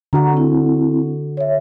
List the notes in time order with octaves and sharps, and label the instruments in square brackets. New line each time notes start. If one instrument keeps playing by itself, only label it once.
[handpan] D3 D4 F#4 [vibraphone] F#5 A#5
[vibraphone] C4 E4
C#5 E5